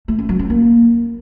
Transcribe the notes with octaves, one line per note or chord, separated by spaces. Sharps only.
A3
C#4
F#3
C#4
A#3